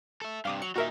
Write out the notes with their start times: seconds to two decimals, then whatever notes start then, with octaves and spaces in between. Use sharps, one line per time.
0.22 A4 E5
0.45 G2 C3 F5 D6 D#6
0.62 F#3 C#7
0.75 A#2 D#4 F#4 A#4 E5